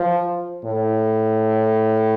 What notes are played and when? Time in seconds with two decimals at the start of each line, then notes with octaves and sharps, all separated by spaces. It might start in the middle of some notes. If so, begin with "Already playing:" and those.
Already playing: F3
0.65 A2